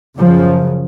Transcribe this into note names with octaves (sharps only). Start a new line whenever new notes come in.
F#2 C#3 F3